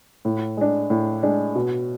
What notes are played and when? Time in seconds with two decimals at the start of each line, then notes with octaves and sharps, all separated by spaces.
0.25 A2
0.57 G#3 D4
0.90 A2
1.23 G#3 D4
1.55 B2